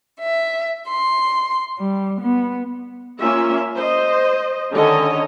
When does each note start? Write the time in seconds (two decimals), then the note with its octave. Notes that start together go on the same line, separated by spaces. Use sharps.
0.19 E5
0.88 C6
1.78 G3
2.20 B3
3.21 A#3 C#4 F4 E5
3.76 C5 D#5
4.72 D3 D#3 C#4 A4 C#5 D#5